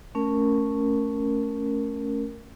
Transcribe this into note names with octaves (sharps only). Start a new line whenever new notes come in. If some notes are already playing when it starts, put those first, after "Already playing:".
A3 C#4 A#4